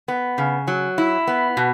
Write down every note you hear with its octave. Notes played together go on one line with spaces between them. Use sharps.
B3
C#3
F#3
E4
B3
B2